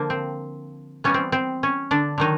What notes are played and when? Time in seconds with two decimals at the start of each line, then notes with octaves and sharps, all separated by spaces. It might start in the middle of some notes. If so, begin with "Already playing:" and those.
Already playing: D3 F3 A#3
0.10 C4
1.04 E3 G3 B3 C#4
1.14 C4
1.32 C4
1.63 C#4
1.91 D3 D4
2.18 D3 D#3 F#3 D#4